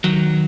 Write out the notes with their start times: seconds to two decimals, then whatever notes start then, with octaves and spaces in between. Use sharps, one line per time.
0.04 D#3 F#3